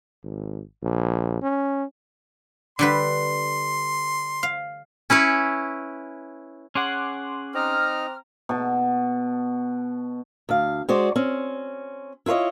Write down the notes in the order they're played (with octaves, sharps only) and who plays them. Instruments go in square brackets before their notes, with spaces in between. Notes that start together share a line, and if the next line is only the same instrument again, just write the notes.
[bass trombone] G#1
A#1
C#4
[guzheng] D3 G3 B4 [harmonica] C6
[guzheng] F5
[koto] C#4 E4 B4 C#5
[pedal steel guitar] C#4 G#4 F#5 [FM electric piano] C6 D6 F#6
[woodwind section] C4 A#5 F6 [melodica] D#4
[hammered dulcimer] B2 A5
[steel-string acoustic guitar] D2 F5
G#3 F#4 C5 D5
C4 C#4
E4 F4 A4 C#5 D#5